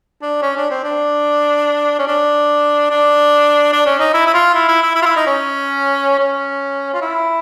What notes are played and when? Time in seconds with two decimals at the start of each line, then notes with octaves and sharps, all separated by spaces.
0.22 D4
0.42 C#4
0.57 D4
0.71 C4
0.84 D4
1.99 C#4
2.07 D4
2.90 D4
3.73 D4
3.86 C#4
3.99 D#4
4.13 E4
4.26 E4
4.34 F4
4.54 E4
4.68 E4
4.82 E4
4.95 E4
5.02 F4
5.06 E4
5.16 D#4
5.26 C#4
6.19 C#4
6.94 F4
7.01 E4